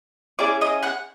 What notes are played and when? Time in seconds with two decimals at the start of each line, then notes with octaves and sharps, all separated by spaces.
0.39 C#4 E4 G#4 D5 D6
0.61 D#5 D#6
0.83 F#5 F#6